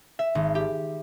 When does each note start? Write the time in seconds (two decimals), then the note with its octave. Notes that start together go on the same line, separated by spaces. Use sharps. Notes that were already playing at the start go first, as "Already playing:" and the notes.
0.19 E5
0.35 G#1
0.55 G4